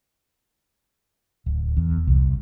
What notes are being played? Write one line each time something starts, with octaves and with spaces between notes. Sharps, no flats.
D1
E2
C2